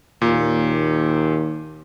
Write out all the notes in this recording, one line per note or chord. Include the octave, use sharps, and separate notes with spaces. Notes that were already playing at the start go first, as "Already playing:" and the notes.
D#2 A#2